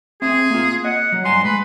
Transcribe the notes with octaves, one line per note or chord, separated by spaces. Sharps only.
C4 G#4 E5
A#3 F4
D#5 F#5
F#3
G2 G#5 A#5 C6
G#3 B4